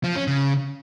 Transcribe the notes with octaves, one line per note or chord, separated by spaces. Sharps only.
F3
C#4
C#3